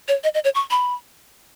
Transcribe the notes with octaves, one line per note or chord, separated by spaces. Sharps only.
C#5
D#5
D#5
C#5
C#6
B5